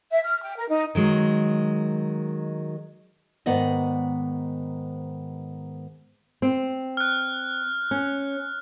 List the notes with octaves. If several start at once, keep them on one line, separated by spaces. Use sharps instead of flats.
E5
F6
G5
A#4
D#4
D#3 F#3 G#3
G#2 D#3 B3 D5 D#5
C4
F6 F#6
C#4